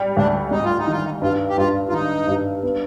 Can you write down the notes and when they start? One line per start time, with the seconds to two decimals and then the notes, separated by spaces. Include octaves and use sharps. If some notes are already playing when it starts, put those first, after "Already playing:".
Already playing: G3
0.17 D2 D4
0.51 G3 D#4
0.64 F4
0.79 D#4
0.87 D#3 F4
1.05 D#4
1.22 G2 F4
1.50 G4
1.58 G2 F4
1.89 F4
1.92 D#3 D#4
2.28 G2
2.63 B3